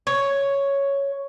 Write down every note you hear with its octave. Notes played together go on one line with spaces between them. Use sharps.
C#5